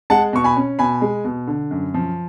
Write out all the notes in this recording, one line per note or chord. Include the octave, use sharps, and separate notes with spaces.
G#3 F#5 A5
B2 C#6
G#5 B5
C#4
B2 G#5 B5
G#3
B2
D3
F#2
F3